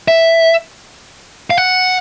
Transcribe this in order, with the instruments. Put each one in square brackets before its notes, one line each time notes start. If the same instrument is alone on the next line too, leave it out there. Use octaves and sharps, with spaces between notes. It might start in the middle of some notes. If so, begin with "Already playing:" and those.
[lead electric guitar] E5
F5
F#5